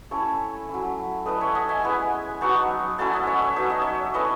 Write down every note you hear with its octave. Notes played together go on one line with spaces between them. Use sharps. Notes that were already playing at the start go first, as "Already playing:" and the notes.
A3 C#4 E4 A4 C#5
F#3 C#4 E4
A3 E4 B4 D#5
C#5 E5
D#5 F#5
E5 G#5
G#3 B3 E4 G#5 B5
F#3 B3 D#4 A5 C#6
F#3 A3 C#4 E4 F#5 A5
G#5
D#5 F#5
C#5 E5
C#5 E5
F#3 B3 D#4 E5
D#5
C#5 E5
A3 C#4 E4 B4 D#5